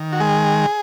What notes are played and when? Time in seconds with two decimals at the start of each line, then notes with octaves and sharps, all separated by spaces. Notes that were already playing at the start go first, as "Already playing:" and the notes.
Already playing: D#3
0.13 F#4
0.20 G#3 G#4